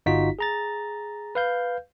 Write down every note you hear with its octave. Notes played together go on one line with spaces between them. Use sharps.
G1 D#4 F4 F#4 B6
G#4 A#5 A6
B4 F5 G6